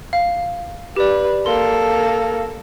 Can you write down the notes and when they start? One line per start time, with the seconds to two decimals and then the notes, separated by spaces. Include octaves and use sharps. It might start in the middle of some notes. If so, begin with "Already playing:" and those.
0.13 F5
0.96 G4 B4 D5
1.46 A#3 A4 C6